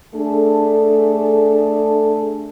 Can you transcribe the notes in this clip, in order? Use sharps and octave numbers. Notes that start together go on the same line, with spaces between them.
A3 D4 G#4 A4